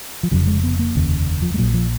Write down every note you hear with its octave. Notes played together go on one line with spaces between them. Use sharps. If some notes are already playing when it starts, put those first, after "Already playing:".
F3
F1 F2 C#3 F#3
G#3
B3
A#3
F1 D#2 C#3
F3
G#3
A#1 A#2 F#3
F3